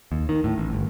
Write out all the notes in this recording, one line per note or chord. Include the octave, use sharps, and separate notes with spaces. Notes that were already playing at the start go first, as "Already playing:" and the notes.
D#2
D#3
A2
A1
G1